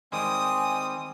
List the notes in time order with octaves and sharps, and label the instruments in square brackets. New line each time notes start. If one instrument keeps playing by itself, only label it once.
[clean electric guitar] D#3 G3 G#3 [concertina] C4 [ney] G#5 [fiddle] D#6